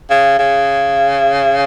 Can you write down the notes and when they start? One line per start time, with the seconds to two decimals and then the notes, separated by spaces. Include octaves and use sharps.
0.10 C#3
0.39 C#3